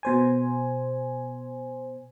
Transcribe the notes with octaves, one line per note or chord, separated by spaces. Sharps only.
B2 C5 G#5